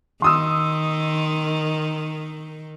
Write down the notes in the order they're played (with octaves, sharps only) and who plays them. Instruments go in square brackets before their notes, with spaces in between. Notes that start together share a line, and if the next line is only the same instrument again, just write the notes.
[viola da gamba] D#3 [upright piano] C6 D#6 E6